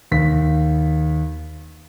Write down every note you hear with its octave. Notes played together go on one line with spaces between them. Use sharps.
D#2 B6